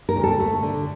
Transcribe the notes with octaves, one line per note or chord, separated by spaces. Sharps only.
A#4
D2
A4
A3
D3